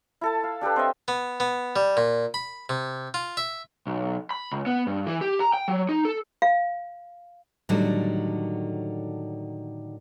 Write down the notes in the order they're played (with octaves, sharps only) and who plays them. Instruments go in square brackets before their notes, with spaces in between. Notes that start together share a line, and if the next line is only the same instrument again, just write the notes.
[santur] E4 A4 A5
F5
D4 G4 A4 B4
C4 D#5 E5
[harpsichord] B3
B3
G3
A#2
B5
C3
F4
E5
[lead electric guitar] B1
B5
C#2
B3
G2
E3
G4
A#5
G5
F#3
D#4
A4
[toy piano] F5
[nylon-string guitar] A2 D3 D#3 F#3 G3